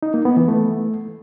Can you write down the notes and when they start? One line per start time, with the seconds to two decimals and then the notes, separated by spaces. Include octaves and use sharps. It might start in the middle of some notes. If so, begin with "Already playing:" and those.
0.03 D#4
0.14 A#3
0.25 B3
0.37 E3
0.48 A3